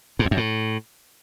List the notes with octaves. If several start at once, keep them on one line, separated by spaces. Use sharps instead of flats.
G#2
E2
F#2
A2